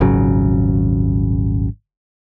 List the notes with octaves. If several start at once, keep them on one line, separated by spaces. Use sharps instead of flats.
D#1 G#1 C#3 F#3